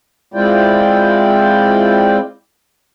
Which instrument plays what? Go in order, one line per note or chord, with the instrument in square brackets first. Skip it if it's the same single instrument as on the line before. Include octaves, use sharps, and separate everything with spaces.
[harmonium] G#3 C4 E4 F4 D5 G5